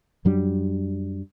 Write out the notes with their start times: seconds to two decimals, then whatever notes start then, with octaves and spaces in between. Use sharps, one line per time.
0.25 F#2 F#3 G3 D4